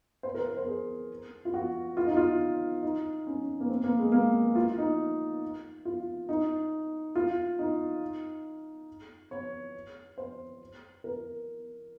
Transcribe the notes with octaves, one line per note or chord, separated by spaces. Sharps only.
C5
A#4
C5
C5
G#4
F4
F#4
F4
D#4
F4
D#4
C#4
A#3
C4
A#3
G#3
A#3
F4
D#4
F4
D#4
F4
D#4
C#5
C5
A#4